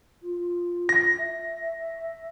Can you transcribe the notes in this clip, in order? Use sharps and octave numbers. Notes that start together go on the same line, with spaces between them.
F4
A#6
E5